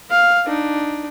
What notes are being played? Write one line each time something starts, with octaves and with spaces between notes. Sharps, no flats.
F5
D4 D#4